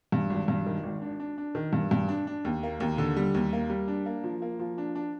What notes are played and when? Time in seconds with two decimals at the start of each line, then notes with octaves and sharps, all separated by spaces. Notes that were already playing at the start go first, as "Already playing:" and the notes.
0.12 G2
0.30 G#1
0.48 G2
0.66 D#3
0.83 G#1
1.02 D4
1.20 D4
1.38 D4
1.55 D#3
1.73 G2
1.91 G2
2.08 D4
2.27 D4
2.45 D#2
2.63 A#3
2.80 D#2
2.98 D3
3.17 G3
3.35 D#2
3.53 A#3
3.70 G3
3.88 D4
4.06 A#3
4.24 F3
4.42 A#3
4.59 F3
4.78 D4
4.95 D4